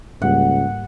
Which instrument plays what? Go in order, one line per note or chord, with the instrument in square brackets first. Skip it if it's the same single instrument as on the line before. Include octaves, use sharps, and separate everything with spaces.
[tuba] C#2 [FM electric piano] G#2 G3 A#3 [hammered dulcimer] F#5